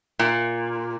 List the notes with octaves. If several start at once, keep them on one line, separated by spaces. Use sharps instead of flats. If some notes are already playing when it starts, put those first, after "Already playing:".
A#2